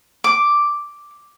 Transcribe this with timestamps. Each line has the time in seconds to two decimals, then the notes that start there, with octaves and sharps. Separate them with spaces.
0.24 D6